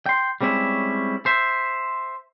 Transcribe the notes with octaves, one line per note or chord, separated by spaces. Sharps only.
G5 C6
G3 G#3 C4 C#4 E4 C#5
C5 E5